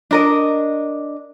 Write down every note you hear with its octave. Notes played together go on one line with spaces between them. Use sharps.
D4 A#4 D#5